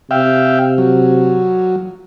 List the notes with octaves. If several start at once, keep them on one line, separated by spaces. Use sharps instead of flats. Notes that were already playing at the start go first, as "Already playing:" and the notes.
C3 E5 F5 G5
F#3